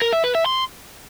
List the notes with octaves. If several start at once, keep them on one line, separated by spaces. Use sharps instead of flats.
A#4
E5
B4
E5
C6